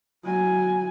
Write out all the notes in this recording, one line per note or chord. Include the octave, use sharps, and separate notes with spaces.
F#3 G#5